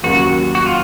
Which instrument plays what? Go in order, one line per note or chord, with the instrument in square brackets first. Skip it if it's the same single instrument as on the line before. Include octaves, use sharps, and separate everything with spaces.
[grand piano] D#2 C#3 F#3 A#3 [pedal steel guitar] F#4
[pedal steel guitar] F#4
F4